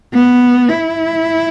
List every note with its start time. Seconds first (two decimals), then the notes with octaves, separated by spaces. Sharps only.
0.14 B3
0.69 E4